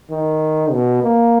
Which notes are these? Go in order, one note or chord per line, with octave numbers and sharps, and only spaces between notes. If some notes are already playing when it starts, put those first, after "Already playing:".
D#3
B2
A#3